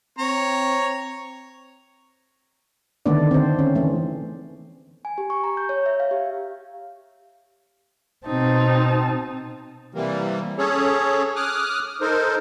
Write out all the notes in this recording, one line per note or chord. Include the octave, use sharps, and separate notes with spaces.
C4 C#5 A#5
D3 D#3 A3 B3 D4 D5
C4 C5
C#4
E3 A3
G#5
G4
C#6
A#5
G6
C#5
E5
F5
G4
B2 C4 D#4 A5
C3 E3 G3 A#3
C#4 G#4 A4 C#5
D6 D#6 F6 F#6
D#4 A4 A#4 C5